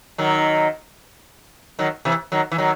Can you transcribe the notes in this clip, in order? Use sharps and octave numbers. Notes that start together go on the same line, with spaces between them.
D#3 F#3
D#3 F#3
C3 E3
D#3 F#3
E3
D#3 F#3